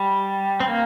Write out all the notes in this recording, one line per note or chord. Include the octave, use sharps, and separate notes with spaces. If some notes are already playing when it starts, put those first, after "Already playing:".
Already playing: G3
C4
A#3